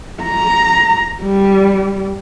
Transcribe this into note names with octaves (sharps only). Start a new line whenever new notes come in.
A#5
G3